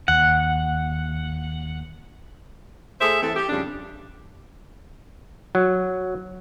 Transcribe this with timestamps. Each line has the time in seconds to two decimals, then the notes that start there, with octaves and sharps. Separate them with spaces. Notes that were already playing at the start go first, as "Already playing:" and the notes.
0.08 D#2 F#5
3.01 A3 G#4 A4 C5 E5
3.22 E3 C4 A4
3.36 G4
3.49 F2 C#3 G3 D4
5.55 F#3